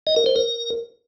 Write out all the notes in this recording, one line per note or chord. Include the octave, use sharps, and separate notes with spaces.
D#5
A#4
C5
A#4